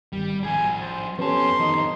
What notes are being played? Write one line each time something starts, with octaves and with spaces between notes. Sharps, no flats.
G#1 G3
F3 G#4 G#5
C5 A6
F2 B3 C#4 G4 A4 A5 C6
F2 D#3 D#4